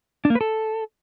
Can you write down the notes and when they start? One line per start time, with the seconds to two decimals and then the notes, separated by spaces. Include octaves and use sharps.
0.25 D4
0.30 A#3
0.35 B4
0.41 A4